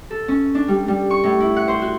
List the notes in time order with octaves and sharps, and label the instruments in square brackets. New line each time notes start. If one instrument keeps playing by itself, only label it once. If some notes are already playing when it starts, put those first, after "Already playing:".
[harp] A4
C#4
D4
G3
G3
C#6
A2
E4
F#5
C5
F#4